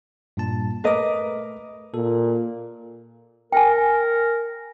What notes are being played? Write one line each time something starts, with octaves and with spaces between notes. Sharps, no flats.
G2 A#2 A5
A3 A#4 B4 D#5 D6
A#2 A4
A#4 G5 G#5